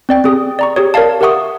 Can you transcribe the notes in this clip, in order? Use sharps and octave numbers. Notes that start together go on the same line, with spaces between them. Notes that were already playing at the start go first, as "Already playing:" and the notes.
C4 D5 G5
C4 G4 G#4 D#6
D5 A#5 C#6
G4 G#4 C#5
A#4 C#5 D5 F5 A5
G4 A#4 E5 F#5 C#6 D#6